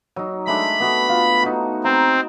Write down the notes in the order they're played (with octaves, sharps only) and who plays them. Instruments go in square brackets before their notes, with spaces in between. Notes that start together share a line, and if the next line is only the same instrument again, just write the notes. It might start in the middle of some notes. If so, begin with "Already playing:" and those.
[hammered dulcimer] F#3 D#4
[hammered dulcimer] G#3 A3 D4 [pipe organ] B5
[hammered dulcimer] B3 F#4 A4
F4
D#4 F#4
[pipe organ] C4 [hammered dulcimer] A#5